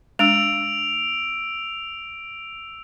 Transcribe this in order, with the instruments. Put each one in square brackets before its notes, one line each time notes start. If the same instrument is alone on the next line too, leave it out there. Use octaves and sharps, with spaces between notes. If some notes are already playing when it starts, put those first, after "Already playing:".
[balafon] G#3 D4 [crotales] E6 D7 F7